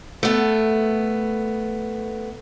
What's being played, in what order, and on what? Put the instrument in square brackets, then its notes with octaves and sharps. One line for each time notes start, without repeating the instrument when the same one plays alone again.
[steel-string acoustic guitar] A3 B3